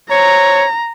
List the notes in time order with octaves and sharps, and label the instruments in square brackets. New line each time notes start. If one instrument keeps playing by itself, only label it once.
[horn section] C5 C#5 [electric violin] A#5